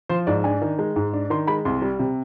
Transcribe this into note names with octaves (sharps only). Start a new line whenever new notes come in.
F3 C5
G#2 D5
D4 G#5
D#3
G#3
G#2
D4
D#3 C6
G#3 B5
C2 C6
G3
C3